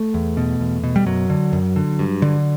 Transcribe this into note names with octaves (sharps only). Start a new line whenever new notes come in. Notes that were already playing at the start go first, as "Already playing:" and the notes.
Already playing: A3
E2
B2
E2
B2
G3
F#2 F#3
D3
F#2
D3
G2
D3